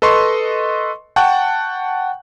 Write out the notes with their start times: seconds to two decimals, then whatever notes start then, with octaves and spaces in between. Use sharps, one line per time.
0.02 A4 B4 D#5 C6 C#6
1.16 F#5 G5 A5 C#6 F#6